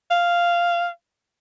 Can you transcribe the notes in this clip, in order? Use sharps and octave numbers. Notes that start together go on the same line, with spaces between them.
F5